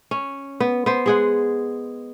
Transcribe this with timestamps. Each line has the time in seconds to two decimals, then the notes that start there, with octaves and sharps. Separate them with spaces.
0.11 C#4
0.60 B3
0.86 B3 C5
1.06 G#3 G#4 F#5